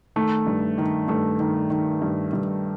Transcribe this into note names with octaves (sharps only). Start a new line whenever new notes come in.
D#3 A3
G2
D#3
G2 A3
D#3
D#3
G2
G2